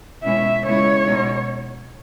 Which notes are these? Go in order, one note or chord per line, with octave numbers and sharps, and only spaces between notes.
B2 G#3 C#4 E4 E5
C#3 G#3 B3 E4 C#5
B2 G#3 D#4